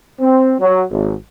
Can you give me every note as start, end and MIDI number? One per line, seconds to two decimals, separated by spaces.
0.20 0.55 60
0.60 0.84 54
0.91 1.15 32